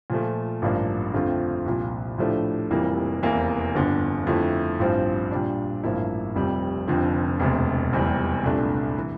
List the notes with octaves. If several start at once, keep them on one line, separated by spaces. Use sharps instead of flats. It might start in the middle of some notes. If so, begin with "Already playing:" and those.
A#2 F3 A3
A1 G2 F3 A#3 D4
F2 D3 A3 C4 F4
C2 A#2 F3
A2 F3 A3 D4 G4
F1 F2 E3 G3 A#3
F1 E2 E3 A#3
G1 F2 D3
F2 D3 A3 E4
A1 G2 F3 C4
A#2 G3 D4
A1 G2 F3 A#3 E4
F1 F2 C3 G3
F1 F2 D3 F3 C4
E1 D2 C3
F1 E2 C3 G3
C2 A#2 A3 D4
E3